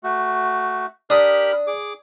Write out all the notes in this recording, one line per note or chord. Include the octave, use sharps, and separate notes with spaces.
A3 F#4
D4 G4 A#4 B5 D#6
G#4 D6